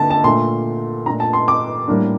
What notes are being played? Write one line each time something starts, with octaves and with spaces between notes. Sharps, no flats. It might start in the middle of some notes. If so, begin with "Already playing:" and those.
Already playing: D3 A#3 A5
A5
A#2 A3 D4 C6
A#2 A3 D4 A#5
A5
C6
D6
A2 G3 A#3 D4